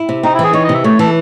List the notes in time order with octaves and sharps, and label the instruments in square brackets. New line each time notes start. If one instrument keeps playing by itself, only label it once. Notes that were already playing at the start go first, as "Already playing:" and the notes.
Already playing: [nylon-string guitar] E4
C3
[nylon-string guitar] C4 [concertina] D#4
[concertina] E4
[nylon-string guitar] E3
[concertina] G#4
[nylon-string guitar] D#4 [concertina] C#5
[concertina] D#5
[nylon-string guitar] C3
[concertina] E5
[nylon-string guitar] A3 [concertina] C#5
[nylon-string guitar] E3 [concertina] A4